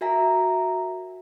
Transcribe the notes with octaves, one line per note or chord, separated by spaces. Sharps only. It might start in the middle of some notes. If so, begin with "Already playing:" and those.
F#4 A#4 E5 G#5 A#5 B6